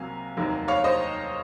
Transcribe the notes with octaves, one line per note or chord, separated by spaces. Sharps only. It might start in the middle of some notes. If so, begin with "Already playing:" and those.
Already playing: C2 C3 F#3 A#3 F5 G#5
F1 D#2 D#3 F#3 A#3
C#5 F5
C5 D#5